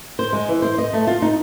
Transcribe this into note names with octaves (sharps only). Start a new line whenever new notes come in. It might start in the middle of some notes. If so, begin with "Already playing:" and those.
C5
G#3
E3
C5
D#5
A3
F4
D#4